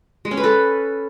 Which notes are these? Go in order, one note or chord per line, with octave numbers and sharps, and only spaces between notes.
G#3
C#4
B4
A4